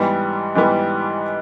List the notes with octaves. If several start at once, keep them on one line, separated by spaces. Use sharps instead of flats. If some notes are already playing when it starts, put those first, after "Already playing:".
Already playing: G#2 E3 G3 B3
G#2 E3 G3 B3